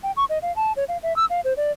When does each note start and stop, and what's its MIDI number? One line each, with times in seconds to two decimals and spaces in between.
0.03 0.12 79
0.17 0.25 85
0.30 0.38 75
0.42 0.54 77
0.56 0.73 81
0.77 0.84 73
0.89 0.98 77
1.03 1.15 76
1.16 1.25 88
1.30 1.41 77
1.44 1.53 72
1.57 1.72 74